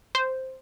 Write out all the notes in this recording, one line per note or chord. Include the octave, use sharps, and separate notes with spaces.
C5